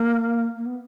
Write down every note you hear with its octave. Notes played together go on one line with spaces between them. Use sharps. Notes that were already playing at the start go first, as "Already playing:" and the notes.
Already playing: A#3
A#3
B3